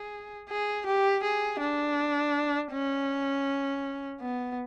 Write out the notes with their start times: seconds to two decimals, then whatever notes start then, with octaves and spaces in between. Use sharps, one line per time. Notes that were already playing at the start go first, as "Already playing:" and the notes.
Already playing: G#4
0.49 G#4
0.86 G4
1.23 G#4
1.60 D4
2.72 C#4
4.21 B3